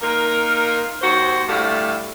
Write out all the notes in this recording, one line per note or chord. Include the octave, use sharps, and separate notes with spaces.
A#3 D#4 F4 A#4
D#2 F#4 C5
D2 A2 G3 A3 E4 F5